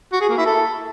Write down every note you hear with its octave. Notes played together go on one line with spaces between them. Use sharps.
F#4
G#4
A#3
E4
A4